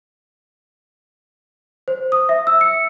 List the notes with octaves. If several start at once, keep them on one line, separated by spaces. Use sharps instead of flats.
C5
D#6
E5
E6
C#7